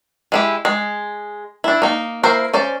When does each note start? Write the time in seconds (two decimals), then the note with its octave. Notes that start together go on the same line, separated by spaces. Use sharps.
0.32 G#3 E4 G4
0.65 G#3
1.64 D4 E4
1.82 A#3 D#4
2.23 A#3 E4 A#4 C5
2.53 C#4 C5 D5